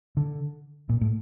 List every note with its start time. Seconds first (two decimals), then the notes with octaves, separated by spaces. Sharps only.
0.17 D3
0.89 A#2
1.01 A2